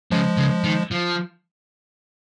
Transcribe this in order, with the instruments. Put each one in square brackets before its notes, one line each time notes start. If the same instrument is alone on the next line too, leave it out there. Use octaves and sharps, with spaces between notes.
[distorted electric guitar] C#3 [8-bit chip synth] F3 G#3
[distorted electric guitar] C#3
D#3
F3